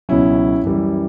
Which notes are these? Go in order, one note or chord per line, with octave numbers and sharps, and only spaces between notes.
C#2 B2 F#3 C#4 E4
F#2 E3 G3